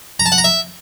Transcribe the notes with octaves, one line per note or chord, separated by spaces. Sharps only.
A#5
A5
F#5
A#5
E5